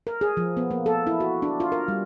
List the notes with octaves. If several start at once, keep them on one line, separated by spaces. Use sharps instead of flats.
A#4
G#4
F3
B3
A#3
A4
E4
F#4
D4
F4
A#4
G3